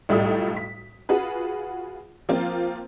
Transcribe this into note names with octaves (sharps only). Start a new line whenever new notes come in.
B1 A2 G3 A3 F4 D#6
B6
F4 F#4 G#4 B4
F3 A#3 C4 F4